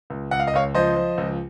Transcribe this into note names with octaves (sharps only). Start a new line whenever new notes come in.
C#2
C#2 F#5
F5
D#5
C#2 C#5 F5
F3 C5 D#5
F3
C#2